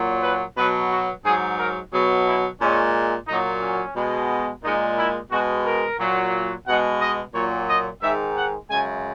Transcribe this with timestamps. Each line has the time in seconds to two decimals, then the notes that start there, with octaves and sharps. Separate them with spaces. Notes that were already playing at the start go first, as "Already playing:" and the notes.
Already playing: A#2 F#3
0.23 B4
0.56 B2 F#3 B4
0.91 F#4
1.24 G#2 F#3 G#4
1.59 A#4
1.93 B2 F#3 G#4
2.26 E4
2.60 A#2 G#3 C#4
3.28 A#2 F#3 D#4
3.61 C#4
3.95 B2 G#3
4.63 A#2 G#3 D#4
4.98 E4
5.31 B2 G#3 F#4
5.65 A#4
5.99 A#2 F#3
6.67 B2 G#3 F#5
7.01 D#5
7.35 A#2 F#3 C#5
7.69 D#5
8.02 G#2 D#3 G#3 E5
8.36 F#5
8.70 F#2 C#3 G#3 G#5